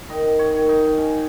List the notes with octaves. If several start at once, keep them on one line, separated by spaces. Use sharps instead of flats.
D#3 D#5
C#5
D#3
D#4
C#4